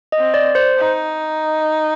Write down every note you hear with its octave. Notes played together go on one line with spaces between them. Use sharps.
D#5
C4
D5
C5
D#4